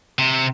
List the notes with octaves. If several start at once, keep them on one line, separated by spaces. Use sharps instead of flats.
C3